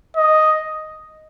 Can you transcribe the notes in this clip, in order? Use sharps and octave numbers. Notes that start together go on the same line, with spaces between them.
D#5